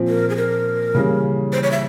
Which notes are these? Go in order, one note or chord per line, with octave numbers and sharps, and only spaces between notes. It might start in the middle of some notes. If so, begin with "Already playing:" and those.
Already playing: A#2 F3 C4
A#4
G#4
A#4
C#3 E3 G3 A#3
C5
C#5
E5